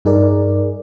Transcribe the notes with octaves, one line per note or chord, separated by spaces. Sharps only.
G2 D#4 G#4 A#4 D5